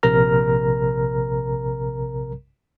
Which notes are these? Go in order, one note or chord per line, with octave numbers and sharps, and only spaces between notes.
A#1 C3 A#4 A#5 F6